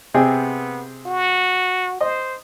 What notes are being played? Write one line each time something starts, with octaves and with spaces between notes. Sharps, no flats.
C3 B3 C4 G#4
F#4
C5 D#5